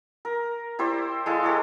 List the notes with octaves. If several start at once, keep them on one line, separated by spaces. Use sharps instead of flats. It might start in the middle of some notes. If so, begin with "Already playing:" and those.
A#4
E4 G4 C5 D5
G#3 E4 A4 F5
G4 A4 C#5 D#5